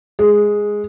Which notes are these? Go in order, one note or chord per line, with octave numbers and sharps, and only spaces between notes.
G#3